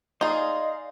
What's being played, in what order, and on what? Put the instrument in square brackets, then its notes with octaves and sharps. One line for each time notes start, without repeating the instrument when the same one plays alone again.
[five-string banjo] D#4 G#4 [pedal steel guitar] D5 F5 C6 [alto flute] D#5